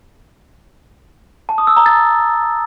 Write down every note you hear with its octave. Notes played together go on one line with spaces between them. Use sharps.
A5
D#6
E6
A#5
A6